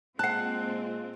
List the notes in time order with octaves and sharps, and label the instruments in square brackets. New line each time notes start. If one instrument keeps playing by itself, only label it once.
[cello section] A#2 C4 F4 [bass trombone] G#3 [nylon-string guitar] F#5 A5 [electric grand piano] F#6 C7